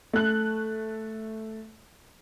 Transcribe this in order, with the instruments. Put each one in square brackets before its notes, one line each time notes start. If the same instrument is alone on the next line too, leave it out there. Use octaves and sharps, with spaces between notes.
[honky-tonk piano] A3 F#6